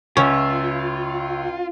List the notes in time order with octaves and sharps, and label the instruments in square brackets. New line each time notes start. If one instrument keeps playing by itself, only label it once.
[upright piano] C#2 [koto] C#4 [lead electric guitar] F4 [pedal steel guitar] C#5 E5